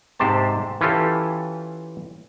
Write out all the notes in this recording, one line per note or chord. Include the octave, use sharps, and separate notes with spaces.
G#2 C3 G4 C5 A5
E3 C#4 F4 G4 A4